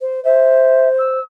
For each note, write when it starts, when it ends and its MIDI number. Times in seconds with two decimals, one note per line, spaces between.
0.01 0.23 72
0.25 1.19 72
0.25 0.89 76
0.99 1.21 88